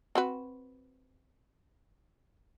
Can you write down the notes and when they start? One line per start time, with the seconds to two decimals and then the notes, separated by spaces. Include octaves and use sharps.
0.15 C4 F#4 B4